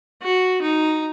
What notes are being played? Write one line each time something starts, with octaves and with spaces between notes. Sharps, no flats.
F#4
D#4